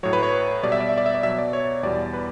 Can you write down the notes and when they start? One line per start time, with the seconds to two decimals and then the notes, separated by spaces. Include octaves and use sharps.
0.03 A2 F#3 C#5
0.13 B4
0.23 C#5
0.63 B2 G3 D5
0.72 E5
0.80 D5
0.89 E5
0.98 D5
1.06 E5
1.15 D5
1.23 B2 F#3 E5
1.38 D5
1.53 C#5
1.83 E2 B2 G3 D5
2.13 B4